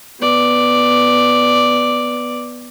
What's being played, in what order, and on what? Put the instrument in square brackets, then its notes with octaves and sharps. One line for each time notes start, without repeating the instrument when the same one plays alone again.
[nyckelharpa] B3 D5